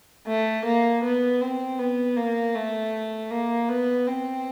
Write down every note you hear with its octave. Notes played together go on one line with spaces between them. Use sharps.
A3
A#3
B3
C4
B3
A#3
A3
A#3
B3
C4